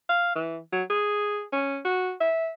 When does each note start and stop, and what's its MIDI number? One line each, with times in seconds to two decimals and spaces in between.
0.09 0.34 77
0.36 0.59 52
0.72 0.83 54
0.90 1.43 68
1.53 1.79 61
1.85 2.13 66
2.21 2.50 76